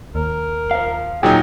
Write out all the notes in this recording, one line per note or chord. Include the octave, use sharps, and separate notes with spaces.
D#2 A#4
C5 F5
A#2 F#3 D#4 G#4 G5